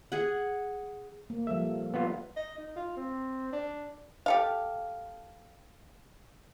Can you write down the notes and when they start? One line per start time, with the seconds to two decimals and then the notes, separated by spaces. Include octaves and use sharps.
0.12 G#4 F#5
1.30 A#3
1.47 F3 G3 A4 E5
1.94 B3 F4
2.36 D#5
2.58 D#4
2.76 F4
2.97 C4
3.53 D4
4.26 G4 A4 F5